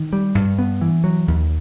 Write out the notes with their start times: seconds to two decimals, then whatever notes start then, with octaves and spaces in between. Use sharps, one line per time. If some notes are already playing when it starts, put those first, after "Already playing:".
Already playing: D#3
0.13 G3
0.35 G2
0.59 B3
0.81 E3
1.04 F#3
1.28 D#2